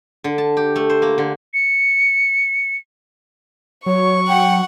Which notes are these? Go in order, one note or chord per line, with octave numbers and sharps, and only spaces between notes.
D3
A5
G4
A3
C5
A#3
D3
C#7
F#3 C#5 C#6
F#5 G5